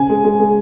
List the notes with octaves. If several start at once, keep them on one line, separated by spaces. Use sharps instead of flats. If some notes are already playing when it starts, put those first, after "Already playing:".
Already playing: C#3 G#5
G#3
G#3
G#3